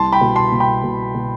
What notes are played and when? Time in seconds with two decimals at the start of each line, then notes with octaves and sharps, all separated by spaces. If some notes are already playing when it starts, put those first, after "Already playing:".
Already playing: C2 A5 C6
0.12 G5 B5
0.21 B2
0.36 A5 C6
0.52 B2
0.60 G5 B5
0.84 B2
1.15 B2